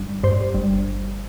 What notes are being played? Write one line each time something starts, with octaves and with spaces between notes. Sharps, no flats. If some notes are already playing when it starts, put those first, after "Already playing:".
Already playing: G1
G2 C5
G1